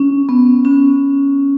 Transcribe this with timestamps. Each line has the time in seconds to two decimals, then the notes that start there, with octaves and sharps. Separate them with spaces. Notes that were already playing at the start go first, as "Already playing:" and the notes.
Already playing: C#4
0.29 B3
0.65 C#4